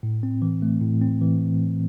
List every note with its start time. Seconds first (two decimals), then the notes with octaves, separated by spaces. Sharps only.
0.03 A2
0.23 C4
0.42 E3
0.62 A3
0.82 A2
1.01 C4
1.22 E3